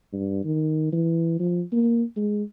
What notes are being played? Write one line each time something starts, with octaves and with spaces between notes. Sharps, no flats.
G2
D#3
E3
F3
A#3
G#3